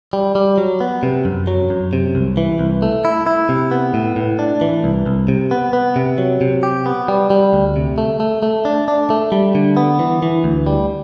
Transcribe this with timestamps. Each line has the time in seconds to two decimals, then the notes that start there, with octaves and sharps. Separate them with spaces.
0.13 G3
0.35 G3
0.58 F#3
0.80 B3
1.03 C3
1.25 F#2
1.47 F#3
1.70 F#2
1.93 C3
2.15 C2
2.37 E3
2.59 C2
2.82 A3
3.05 E4
3.26 E4
3.49 C3
3.71 B3
3.94 A2
4.16 A2
4.39 D4
4.61 E3
4.84 C2
5.06 C2
5.28 C3
5.51 B3
5.73 B3
5.96 C3
6.18 F#3
6.41 C3
6.63 G4
6.86 B3
7.08 G3
7.30 G3
7.53 D2
7.76 C3
7.98 A3
8.20 A3
8.43 A3
8.65 D4
8.88 D4
9.10 A3
9.32 G3
9.55 D3
9.77 B3
9.99 E3
10.23 E3
10.44 D2
10.67 G3